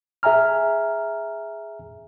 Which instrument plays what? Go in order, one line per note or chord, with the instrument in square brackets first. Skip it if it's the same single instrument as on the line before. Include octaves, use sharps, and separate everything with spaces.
[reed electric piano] G#4 E5 G#5 A#5 F6